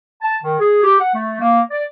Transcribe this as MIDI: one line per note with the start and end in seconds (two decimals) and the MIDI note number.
0.22 0.37 81
0.43 0.56 51
0.59 0.83 68
0.84 0.99 67
1.00 1.11 78
1.14 1.37 57
1.41 1.60 58
1.71 1.83 74